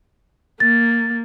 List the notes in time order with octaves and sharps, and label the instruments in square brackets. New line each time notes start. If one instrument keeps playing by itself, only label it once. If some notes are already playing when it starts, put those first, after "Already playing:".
[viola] A#3 [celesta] A6